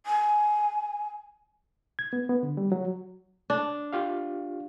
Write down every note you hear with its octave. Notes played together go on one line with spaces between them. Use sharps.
G#5
G#6
B3
B3
D3
G3
F#3
D4
F4 G4 F5